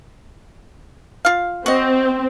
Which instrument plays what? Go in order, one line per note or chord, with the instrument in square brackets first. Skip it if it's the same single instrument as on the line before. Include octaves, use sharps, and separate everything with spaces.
[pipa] F4 F5
[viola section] C4 [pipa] F#4 D#5